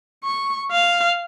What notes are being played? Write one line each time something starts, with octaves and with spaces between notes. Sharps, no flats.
C#6
F5